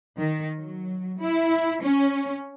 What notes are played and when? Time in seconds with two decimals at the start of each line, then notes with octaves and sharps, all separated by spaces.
0.18 D#3
0.56 F#3
1.19 E4
1.83 C#4